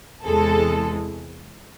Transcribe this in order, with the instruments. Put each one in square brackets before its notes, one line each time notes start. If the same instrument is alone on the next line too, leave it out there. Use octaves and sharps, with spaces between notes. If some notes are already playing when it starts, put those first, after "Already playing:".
[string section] E2 C3 E3 G#3 A4